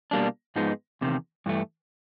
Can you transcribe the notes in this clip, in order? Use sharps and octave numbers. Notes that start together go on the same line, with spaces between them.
B2 G3 A#3 D4
G#2 F3 G#3 B3 D#4
E2 C3 D#3
G2 E3 A3